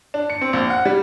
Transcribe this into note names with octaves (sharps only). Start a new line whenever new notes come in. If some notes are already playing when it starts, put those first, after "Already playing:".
D4
C#7
C4
A#1
F#5
G3